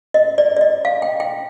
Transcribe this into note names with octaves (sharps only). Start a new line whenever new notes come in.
D#5
D5
D5
D#5
F5
G5
G5